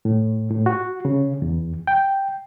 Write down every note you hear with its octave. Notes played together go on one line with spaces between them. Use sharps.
A2
A2
F#4
C#3
E2
G5